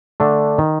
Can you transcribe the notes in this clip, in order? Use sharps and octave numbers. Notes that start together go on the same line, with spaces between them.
D3 A3 D4
D#3